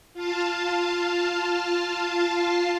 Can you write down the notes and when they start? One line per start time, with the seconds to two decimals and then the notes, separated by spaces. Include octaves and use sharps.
0.14 F4 F5 A5